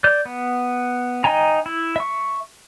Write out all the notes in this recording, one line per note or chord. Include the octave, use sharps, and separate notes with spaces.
D5 G6
B3
D#4 D#5 G5 G#5 A#5
E4
E5 C#6